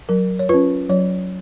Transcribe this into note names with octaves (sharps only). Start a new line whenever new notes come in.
F#3 A#4
C#5
C#4 F4 B4
F#3 C#5